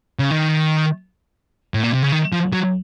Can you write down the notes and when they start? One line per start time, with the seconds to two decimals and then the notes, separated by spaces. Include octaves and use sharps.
0.19 C#3
0.31 D#3
1.74 A2
1.83 A#2
1.93 C3
2.03 C#3
2.12 D#3
2.33 F3
2.53 F#3